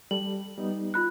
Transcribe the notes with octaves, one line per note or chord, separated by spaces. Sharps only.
G3 A4 F#7
G3 B3 D#4
F4 B5 F#6